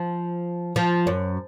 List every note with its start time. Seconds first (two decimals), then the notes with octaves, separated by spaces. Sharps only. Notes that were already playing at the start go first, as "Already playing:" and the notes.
Already playing: F3
0.76 F3
1.07 F#2